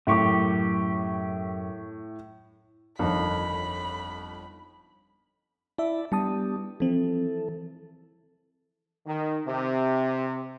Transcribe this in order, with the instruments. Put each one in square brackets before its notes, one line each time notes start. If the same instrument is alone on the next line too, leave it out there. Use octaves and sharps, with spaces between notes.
[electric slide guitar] F#2 F#3 G4 [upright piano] A2 C#6 D6
[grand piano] G1 D3 D#3 [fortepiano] F2 [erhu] B5
[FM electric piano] E4 E5 [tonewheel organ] D5 A5 B5
[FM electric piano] G3 A5 D#6 [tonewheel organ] B3 D4 G4
[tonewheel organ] E3 A4 [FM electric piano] F3 C4
[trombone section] D#3
C3